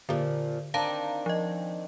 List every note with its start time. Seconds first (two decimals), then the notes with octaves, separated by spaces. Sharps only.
0.09 A#2 D3 F3
0.74 D#3 C4 D4 F5 A5 A#5
1.26 F3 D#5